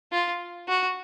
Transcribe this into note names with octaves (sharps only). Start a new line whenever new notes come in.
F4
F#4